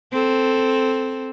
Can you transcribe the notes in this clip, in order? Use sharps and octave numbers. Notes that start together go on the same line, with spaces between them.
C4 A4